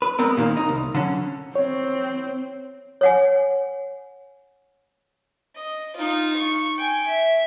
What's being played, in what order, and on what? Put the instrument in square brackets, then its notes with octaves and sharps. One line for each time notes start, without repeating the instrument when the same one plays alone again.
[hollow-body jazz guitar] B4
G#3 B3 C4 A#4
A#2 D#3 A#3
D#4
C2
D3 F#3 C#4
[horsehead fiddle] C4 [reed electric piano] C#5
[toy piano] C#5 F#5 G#5
[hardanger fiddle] D#5
D#4 F4
C#6
G5 G#5
E5